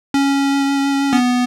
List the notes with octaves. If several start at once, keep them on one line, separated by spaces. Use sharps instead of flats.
C#4
B3